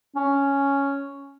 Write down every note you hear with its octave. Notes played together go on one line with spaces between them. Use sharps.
C#4